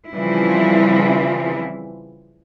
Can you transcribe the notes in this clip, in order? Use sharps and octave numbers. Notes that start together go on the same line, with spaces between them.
C#3 E3 F3 G3 C4 E4